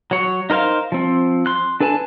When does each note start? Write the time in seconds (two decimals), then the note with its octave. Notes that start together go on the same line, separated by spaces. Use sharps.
0.11 F#3 C#5
0.50 D#4 A#4 C5 F5
0.92 F3 C4
1.46 C6 F#6
1.80 D4 A4 B4 G#5 A5